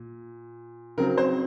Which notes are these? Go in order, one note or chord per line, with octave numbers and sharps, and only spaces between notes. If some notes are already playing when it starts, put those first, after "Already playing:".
Already playing: A#2
C#3 F#3 C4 A#4
C5